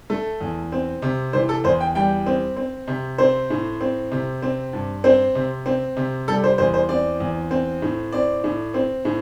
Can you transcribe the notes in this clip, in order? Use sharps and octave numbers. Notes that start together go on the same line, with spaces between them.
A3 A4
E2
C4
C3
E3 C5
A4
E2 C5
G5
G3 G5
C4
C4
C3
C4 C5
A2
C4
C3
C4
G2
C4 C5
C3
C4
C3
G3 A4
C5
E2 C5
C5
C4 D5
E2
C4
A2
C4 D5
A2
C4
A2